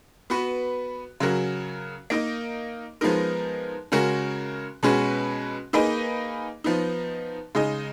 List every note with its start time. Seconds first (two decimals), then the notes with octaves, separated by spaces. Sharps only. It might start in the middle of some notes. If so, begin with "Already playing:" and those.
0.30 B3 F#4 B4
1.20 C#3 F#3 C#4 F#4 A#4
2.10 A#3 D#4 A#4 D#5
3.01 F3 G#3 B3 D#4 A#4
3.92 C#3 G#3 C#4 F#4 A#4
4.83 B2 G#3 C#4 F#4 B4
5.73 A#3 D#4 G#4 B4 D#5
6.64 F3 B3 D#4
7.55 C#3 G#3 D#4 G#4 D#5